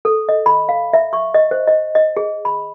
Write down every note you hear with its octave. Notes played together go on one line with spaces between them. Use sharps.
A4
D#5
B5
F5
E5
C#6
D#5
C5
D#5
D#5
G#4
B5